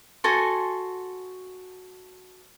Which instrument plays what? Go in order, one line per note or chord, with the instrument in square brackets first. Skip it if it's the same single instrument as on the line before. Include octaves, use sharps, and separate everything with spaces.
[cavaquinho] F#4 A4 G#5 C6